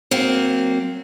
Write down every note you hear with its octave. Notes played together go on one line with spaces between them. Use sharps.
F#3 A#3 C4